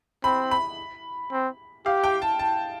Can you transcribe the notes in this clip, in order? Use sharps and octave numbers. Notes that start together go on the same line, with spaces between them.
C4 B5
B5
C4
G4 F5
G5
A5
A5